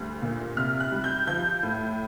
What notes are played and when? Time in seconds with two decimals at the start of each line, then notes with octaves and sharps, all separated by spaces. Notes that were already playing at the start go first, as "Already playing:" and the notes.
Already playing: D2 G3
0.22 A#2
0.56 C3 F6
0.80 F#6
0.92 G3
1.04 G6
1.27 F3 G6
1.63 A2